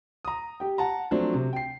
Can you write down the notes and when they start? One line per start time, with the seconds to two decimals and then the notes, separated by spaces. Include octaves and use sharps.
0.25 A#5 D#6
0.60 G4 G5
0.78 F#5 A5 A#5
1.11 F3 F#3 A3 C4 D4
1.34 C3
1.53 G5 C7